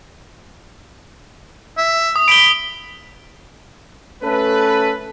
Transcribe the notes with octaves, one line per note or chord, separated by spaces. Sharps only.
E5
D#6
B5 D7 G7
A3 C#4 A4 B4